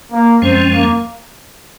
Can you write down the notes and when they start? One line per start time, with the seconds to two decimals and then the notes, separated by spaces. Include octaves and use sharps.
0.12 A#3
0.42 F#2 F3 G#3 C4 C#4
0.73 A#3